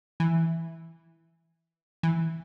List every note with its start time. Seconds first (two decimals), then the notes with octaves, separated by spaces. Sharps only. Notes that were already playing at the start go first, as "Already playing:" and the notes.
0.20 E3
2.03 E3